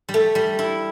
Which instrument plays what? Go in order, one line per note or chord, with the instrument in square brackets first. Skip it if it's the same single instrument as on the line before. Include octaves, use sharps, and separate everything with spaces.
[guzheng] G3
A3
G3
E4